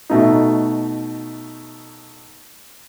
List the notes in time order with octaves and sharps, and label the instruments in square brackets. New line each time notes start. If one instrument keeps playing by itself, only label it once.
[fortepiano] B2 A3 D#4